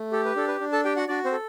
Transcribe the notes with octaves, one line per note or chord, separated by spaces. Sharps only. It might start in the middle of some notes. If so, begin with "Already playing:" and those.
Already playing: A3
G4 A4
B4
D4 A4
B4
D4
A4 A5
G4 G5
F#4 F#5
D4 F#4 D5
C4 C5
A4